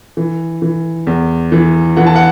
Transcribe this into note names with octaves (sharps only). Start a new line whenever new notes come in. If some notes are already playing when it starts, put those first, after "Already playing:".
E3
E3
E2
E3
E3 F#5
A5
F#5